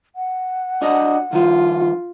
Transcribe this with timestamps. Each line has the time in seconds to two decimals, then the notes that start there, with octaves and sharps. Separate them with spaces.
0.16 F#5
0.82 D4 F#4 D#5
1.33 D#3 F3 F4